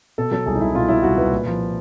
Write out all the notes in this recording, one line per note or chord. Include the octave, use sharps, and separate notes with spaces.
B2 A4
F#3 A4
C2 G#4
D#4
C2 E4
B2 F4
F#3 E4
C2 F#4
C2 B4
A#2
F3